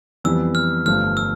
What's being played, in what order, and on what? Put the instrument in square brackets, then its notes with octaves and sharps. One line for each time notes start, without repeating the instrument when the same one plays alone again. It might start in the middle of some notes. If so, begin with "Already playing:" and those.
[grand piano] F2 E3 G3 B3 [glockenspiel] E6
[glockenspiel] F6
[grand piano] G1 G2 F3 A3 [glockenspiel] F6
[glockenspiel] E6